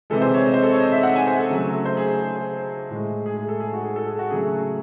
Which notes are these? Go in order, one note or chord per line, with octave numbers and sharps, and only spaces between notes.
C3 E3 G#3 A4
C5
C#5
D#5
C5
A4
C#5
D#5
E5
F#5
G#5
C5
A4
C#3 F#3 A3
C5
G#4
G#4
C5
A2 G#3
G#4
G#4
A4
G#4
F#4
G#4
A4
G#4
F#4
C#3 F#3 A3 G#4